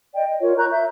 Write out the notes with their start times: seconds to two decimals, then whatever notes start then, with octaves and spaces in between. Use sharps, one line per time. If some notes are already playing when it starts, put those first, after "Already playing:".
0.15 D5 D#5 G5
0.28 D#5
0.41 F4 A#4 C#5
0.58 A#5 C#6 F#6 G6
0.71 E5 G6